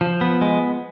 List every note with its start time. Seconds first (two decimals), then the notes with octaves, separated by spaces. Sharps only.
0.01 F3
0.21 B3
0.41 G#3